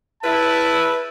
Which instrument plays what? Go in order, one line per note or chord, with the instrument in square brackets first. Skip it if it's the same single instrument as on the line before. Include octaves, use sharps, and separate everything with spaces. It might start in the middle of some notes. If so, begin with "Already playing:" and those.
[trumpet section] E4 [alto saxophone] B4 [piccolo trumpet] A5